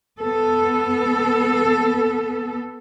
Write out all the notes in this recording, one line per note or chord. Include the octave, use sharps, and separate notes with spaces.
B3 A4